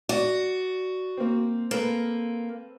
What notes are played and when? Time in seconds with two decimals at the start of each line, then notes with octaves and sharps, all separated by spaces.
0.09 F#4 D5
1.17 A#3 C4
1.71 A#3 C4 A4 B4